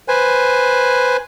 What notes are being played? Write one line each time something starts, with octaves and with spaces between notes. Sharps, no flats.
B4 C5 G#5